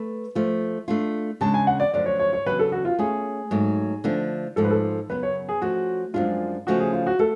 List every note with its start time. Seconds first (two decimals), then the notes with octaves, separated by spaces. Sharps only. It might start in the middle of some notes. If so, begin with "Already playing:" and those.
Already playing: A3 B4
0.35 F3 A3 F4
0.88 A3 D4 F4
1.41 C#3 G#3 D4 A5
1.54 G#5
1.67 F#5
1.80 D5
1.94 F#2 D3 F3 A3 D5
2.06 C#5
2.19 C#5
2.33 C#5
2.46 C#3 F#3 B3 D4 B4
2.59 A4
2.72 F#4
2.85 F4
2.99 A3 C#4 F4 G#4
3.51 G#2 F#3 A3
4.04 D3 F3 A3 D4
4.56 G#2 F3 A3 A4
4.64 B4
4.70 A4
5.09 F#2 C#3 F#3 B3 B4
5.23 C#5
5.49 G#4
5.62 F3 A3 C#4 F#4
6.14 F#2 F3 G#3 D4 F4
6.67 C#3 F3 A3 C#4 F#4
6.80 G#4
6.93 F4
7.06 F#4
7.19 A3 A4